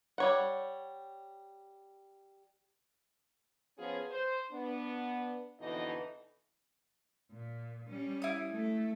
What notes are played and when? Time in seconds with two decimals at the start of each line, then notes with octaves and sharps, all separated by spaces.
0.18 G3 C#5 F#5
3.78 F3 B3 C#4 F4 G#4
4.11 C5
4.52 B3 D4
5.61 F2 B2 D3 E3 D#4 D#5
7.31 A#2
7.89 G3 C#4
8.22 E4 D#6
8.52 A3